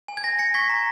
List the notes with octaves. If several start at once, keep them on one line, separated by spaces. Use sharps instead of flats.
G#5
G#6
G#5 A#6
G#5 A#6 C#7
C#6 G#6 B6
A#5